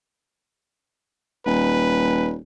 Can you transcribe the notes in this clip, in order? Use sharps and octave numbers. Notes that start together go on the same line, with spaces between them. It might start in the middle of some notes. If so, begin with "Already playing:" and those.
D#1 B4